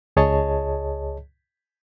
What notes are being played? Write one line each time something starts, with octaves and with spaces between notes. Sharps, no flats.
C#2 G#4 C#5 D#5 A5